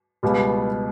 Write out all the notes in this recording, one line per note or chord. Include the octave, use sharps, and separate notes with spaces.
C#2 B2 G3